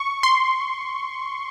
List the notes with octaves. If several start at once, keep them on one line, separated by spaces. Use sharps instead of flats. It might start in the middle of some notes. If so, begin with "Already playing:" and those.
Already playing: C#6
C6